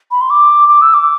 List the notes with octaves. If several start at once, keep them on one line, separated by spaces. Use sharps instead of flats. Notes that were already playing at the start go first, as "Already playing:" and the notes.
B5
C6
D6
D6
E6
D6